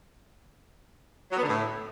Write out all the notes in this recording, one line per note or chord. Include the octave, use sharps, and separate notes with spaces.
F#3
B3
D3
A2